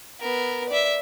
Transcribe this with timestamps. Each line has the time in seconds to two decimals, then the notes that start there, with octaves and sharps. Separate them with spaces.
0.20 B3 A#4
0.69 D5 E5